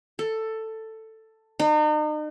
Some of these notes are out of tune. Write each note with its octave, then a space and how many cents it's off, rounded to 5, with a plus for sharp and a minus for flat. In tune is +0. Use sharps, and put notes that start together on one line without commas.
A4 +10
D#4 -40